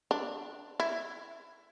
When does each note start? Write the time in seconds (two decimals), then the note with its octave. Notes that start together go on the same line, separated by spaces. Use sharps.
0.11 D4
0.80 E4